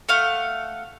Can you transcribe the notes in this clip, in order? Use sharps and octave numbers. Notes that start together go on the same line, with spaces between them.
A3 F5 F#5